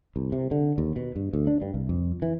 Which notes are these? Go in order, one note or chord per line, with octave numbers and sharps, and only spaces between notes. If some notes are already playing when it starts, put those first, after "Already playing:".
C2
C3
D3
D#2
B2
G2
D2
D4
G2
C2
F2
E3